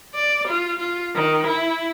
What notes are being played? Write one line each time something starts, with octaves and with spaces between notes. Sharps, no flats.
D5
F4
F4
D#3
E4